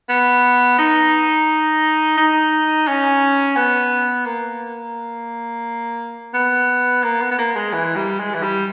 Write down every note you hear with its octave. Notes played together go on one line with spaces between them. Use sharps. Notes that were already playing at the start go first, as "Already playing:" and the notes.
B3
D#4
D#4
C#4
B3
A#3
B3
A#3
B3
B3
A#3
G#3
E3
G3
G#3
E3
G3